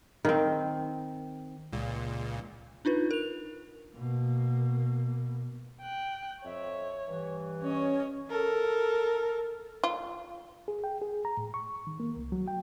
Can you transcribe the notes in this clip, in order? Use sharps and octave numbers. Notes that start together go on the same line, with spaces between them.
D#3 C4
C#2 A#2
D4 D#4 F4 B4
A#4 F7
B2 A#3
G5 F#6
F2 C#5 E5
G2 E3
C#4 C#5 D#5
A4 A#4
F4
G#4
G5
G#4
A#5
A2
C#6
D#3
A#3
C2
F#3
G5